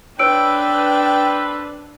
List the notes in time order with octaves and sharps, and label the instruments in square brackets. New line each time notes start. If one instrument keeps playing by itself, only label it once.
[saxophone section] C4 A4 B4 [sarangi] D4 [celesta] C#5 E6 D7 [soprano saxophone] G5